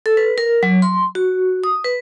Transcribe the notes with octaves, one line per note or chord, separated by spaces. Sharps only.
A4
B4
A#4
F#3
C6
F#4
D#6
B4